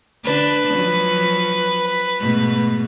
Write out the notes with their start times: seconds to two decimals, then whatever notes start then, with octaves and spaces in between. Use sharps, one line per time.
0.25 D3 D4 B4
0.72 F3 F#3
2.19 G#2 B2 A3